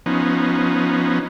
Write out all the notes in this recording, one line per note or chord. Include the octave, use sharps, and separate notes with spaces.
F3 B3 C#4 D#4